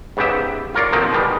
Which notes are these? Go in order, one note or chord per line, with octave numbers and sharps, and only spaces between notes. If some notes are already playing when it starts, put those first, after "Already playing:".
G#2 C#3 B3 G4 E5
F4 A#4 C#5 D5 F5
D#3 F3 F#3 A#3 C4 D#4
B2 D#3 G3 G#3